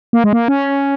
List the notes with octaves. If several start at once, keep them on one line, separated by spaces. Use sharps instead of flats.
A#3
G#3
A#3
C#4